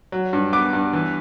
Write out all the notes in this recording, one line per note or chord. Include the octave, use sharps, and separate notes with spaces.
F#3
G2
B3 D6
G2
E3